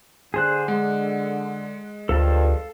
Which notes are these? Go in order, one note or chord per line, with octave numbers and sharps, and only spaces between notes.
D3 G#4 C5 F#6
G#3 F#5
D2 G2 F3 A4 F5 A5